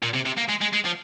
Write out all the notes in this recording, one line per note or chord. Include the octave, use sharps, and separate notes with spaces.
A#2
C3
C3
A#3
G#3
G#3
G#3
F3